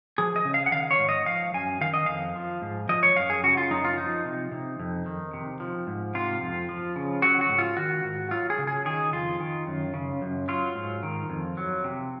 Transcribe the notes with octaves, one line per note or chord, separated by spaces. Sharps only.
F3 G#4
D#5
C#3
F5
F#5
D#3 F5
C#5
G#2
D#5
F3 F5
F#2 G#5
D#3 F5
D#5
F2 F5
F3
G#2
F3 D#5
C#5
F#2 F5
G#4
C#3 F#4
F4
F#2 D#4
F4
F3 D#4
C3
C3
F2
D#3
C3
F3
G#2
C3 F4
F2
F3
C#3
F#3 F#4
F#4
G#2
F4
D#3 F#4
G#2
F#3 F4
G#4
C#3
G#4
D#3 G#4
F2 F4
D#3
F#2
C#3
F#2
F#3 F4
G#2
D#3
F2
F#3
C3